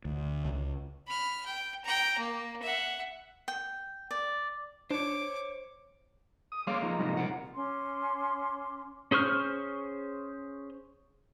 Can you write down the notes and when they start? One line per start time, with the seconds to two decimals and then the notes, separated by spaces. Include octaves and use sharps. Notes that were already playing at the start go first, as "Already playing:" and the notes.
0.05 D2
0.45 C#2
1.07 B5 F6
1.45 G5
1.84 G5 A#5
2.18 A#3
2.62 E5 F#5
3.48 G5
4.11 D5
4.91 D4 C5 C#5 D6
6.52 D#6
6.67 G#3 A#3 C#5 F5 C6 D6
6.82 F3 D#4 A#5
6.99 C2 G#2 C3
7.17 C3 F3 A#4 F#5
7.55 C#4 C6 D6
9.11 C#4 G#4 C5 C#6 F6